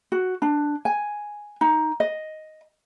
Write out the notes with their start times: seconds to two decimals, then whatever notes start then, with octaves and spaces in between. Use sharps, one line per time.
0.12 F#4
0.42 D4
0.85 G#5
1.61 D#4
2.00 D#5